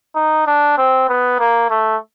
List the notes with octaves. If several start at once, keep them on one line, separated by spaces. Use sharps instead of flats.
D#4
D4
C4
B3
A#3
A3